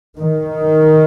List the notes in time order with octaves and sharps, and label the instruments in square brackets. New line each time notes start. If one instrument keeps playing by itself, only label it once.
[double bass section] D#3